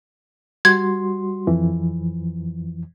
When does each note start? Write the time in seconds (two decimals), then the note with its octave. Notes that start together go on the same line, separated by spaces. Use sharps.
0.65 G3 F#4 C6 G#6
1.47 F2 E3 F3